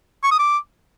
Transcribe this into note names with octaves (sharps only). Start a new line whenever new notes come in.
C#6
D#6
D6